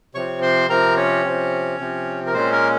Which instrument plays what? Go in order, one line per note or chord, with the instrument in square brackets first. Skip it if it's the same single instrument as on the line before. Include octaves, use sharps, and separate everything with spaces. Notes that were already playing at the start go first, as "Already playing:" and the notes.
[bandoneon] C3 F3 C4 C#5 C#6
C5 C6
C3 F3 C4 A#4 A#5
C#4 C#5
C3 F3 C4
C3 F3 C4
A#4
A#2 G#3 C4 C#4 C5
A#3 A#4